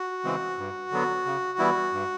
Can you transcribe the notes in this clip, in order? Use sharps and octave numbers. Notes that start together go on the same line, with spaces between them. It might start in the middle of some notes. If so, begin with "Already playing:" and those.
Already playing: F#4
C#3 E3 G#3 C4
G2
D3 F#3 B3
C#3
E3 G3 B3 E4
G2